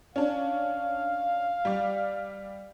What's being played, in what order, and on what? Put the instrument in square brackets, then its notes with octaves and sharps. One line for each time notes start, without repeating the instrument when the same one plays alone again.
[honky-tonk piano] C#4 D4 [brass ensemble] F5
[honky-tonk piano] G3 D5